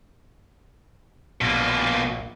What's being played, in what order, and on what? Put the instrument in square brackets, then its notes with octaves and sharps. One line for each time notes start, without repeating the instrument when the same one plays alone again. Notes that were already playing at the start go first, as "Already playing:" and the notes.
[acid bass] A#1 [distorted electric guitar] B2 A#3